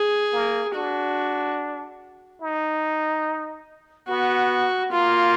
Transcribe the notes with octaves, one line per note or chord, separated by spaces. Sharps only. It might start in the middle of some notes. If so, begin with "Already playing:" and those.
Already playing: G#4
A#3
D4 F#4
D#4
B3 F#4
A#3 F4